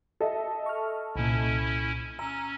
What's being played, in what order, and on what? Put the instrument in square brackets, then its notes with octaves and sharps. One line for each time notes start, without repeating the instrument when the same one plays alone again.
[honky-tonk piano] A4 D#5 E5
[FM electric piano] C#6 F6
[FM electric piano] C2 A#2 [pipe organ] C#4 E4
[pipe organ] C#4 [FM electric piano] A#5 [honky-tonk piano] E6